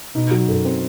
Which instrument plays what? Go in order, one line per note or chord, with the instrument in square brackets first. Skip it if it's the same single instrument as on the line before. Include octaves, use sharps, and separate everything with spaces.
[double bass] B2 [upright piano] D#4
[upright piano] F#3
[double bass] F#2 [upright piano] A4
[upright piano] C4